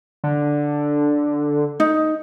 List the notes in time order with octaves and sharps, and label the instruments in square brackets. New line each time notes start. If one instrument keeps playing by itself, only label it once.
[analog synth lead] D3
[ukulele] D#4